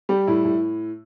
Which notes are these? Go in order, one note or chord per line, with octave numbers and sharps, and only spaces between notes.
G3 G4
A2 E4
A2